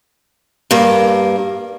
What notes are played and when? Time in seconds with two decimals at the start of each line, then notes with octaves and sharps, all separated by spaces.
0.71 G2 A#3